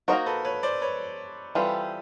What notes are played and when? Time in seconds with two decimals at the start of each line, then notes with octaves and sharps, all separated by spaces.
0.08 A#3 D#4 F#4 A#4 C5
0.26 A4 B4
0.45 B4 C#5
0.63 C5 D5
0.82 B4 C#5
1.55 E3 G3 C4 F4 A4 B4